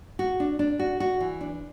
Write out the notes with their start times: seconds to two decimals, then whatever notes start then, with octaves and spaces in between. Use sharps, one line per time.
0.19 F#4
0.40 D4
0.59 D4
0.79 F#4
1.00 F#4
1.20 E3
1.41 D4